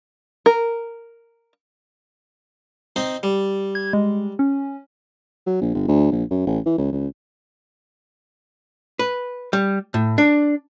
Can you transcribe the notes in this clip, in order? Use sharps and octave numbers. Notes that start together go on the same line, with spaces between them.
A#4
C4 D#4 C5
G3
G#6
G#3
C#4
F#3
A#1
G1
D2
A#1
F#2
A1
E3
C#2
C#2
B4
G3
A2
D4